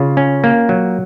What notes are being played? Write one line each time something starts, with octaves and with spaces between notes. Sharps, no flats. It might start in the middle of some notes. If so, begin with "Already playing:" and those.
Already playing: C#3 F4
C#4
A#3
F#3